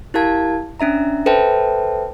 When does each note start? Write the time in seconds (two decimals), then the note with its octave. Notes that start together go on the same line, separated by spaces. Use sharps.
0.14 E4 G4 A#4 F5 A5 G#6
0.80 C#4 D4 E5 A#5
1.26 A4 B4 C5 E5 G5 A5